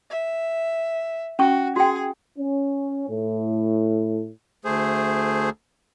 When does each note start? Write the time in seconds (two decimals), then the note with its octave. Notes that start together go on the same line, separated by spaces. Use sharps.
0.10 E5
1.39 C#4 F#4 C#6
1.76 F#4 G#4 G5
2.38 C#4
3.09 A2
4.65 D2 A3 G#4 C5